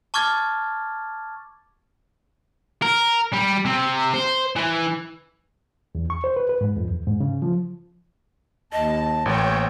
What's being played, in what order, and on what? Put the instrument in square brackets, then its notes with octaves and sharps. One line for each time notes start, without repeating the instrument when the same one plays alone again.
[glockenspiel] A5 C#6 D6 F6 G#6 A6
[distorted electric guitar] A#4
G3
C3
C5
E3
[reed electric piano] E2
C#6
C5
B4
B4
G#2
F2
E2
G#2
C#3
F3
[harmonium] D#2 A5 [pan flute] D#5
[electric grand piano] A1 [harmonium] A#3 C4 C5 [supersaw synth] C#5 G5